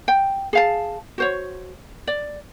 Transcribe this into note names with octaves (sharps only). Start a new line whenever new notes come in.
G5
G#4 F5 A5
F#4 C5 C#5
D5